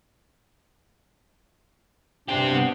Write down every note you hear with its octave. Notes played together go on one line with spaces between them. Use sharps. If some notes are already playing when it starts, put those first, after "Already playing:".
G2 C4 D4 G4
B3